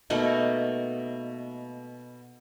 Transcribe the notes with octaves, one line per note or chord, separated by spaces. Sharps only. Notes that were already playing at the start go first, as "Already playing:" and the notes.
B2 A3 A#3 D#4